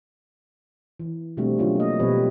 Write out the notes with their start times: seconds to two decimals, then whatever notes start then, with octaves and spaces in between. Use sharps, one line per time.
1.00 E3
1.37 B2 D3 G3 A3 C4 F#4
1.59 D3 F#3 C#4 F4
1.75 A#3 D#5
2.00 B2 F3 G3 C4 B4 C#5